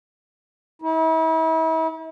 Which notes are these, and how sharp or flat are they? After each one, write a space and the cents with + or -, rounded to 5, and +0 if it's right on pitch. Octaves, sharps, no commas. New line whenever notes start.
E4 -40